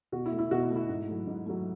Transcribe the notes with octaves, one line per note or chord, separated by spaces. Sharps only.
B2 F#4
E4
A3
E4
B2 F#4
E4
A3
E4
G#2
F#3 A3
G#2
F#3 A3